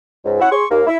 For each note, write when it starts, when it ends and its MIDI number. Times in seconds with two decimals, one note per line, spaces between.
0.24 0.37 37
0.24 0.37 44
0.40 0.50 61
0.40 0.50 64
0.40 0.50 76
0.40 0.50 78
0.51 0.64 68
0.51 0.64 84
0.51 0.64 85
0.70 0.82 39
0.70 0.82 58
0.86 0.97 64